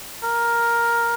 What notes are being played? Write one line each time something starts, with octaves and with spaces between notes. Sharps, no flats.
A#4